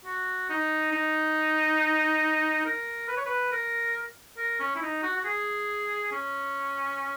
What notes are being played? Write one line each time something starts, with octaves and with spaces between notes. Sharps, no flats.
F#4
D#4
D#4
A#4
B4
C#5
B4
A#4
A#4
C#4
E4
D#4
F#4
F#4
G#4
C#4